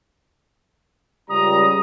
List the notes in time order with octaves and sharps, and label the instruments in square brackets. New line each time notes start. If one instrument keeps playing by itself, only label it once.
[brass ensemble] C#2 G3 A#5 [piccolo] D#6